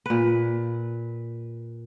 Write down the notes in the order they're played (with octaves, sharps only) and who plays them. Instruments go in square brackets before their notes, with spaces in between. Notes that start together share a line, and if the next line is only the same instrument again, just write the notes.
[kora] A#2 B4